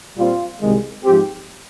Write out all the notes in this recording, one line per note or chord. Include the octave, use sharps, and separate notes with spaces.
A#2 G3 C4 F4
C2 C3 D#3 G#3
G#2 F3 C4 G4